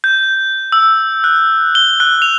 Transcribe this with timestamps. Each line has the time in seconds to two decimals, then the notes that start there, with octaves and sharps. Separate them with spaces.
0.04 G6
0.72 E6
1.24 F#6
1.75 G7
2.00 F#6
2.22 F7